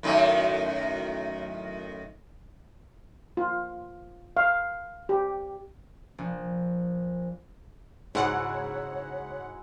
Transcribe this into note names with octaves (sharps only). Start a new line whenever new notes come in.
F#2 A2 D#3
F4
F5
G4
A#1
G#2 C#3 F#3 G#3 E4 C#5 F#5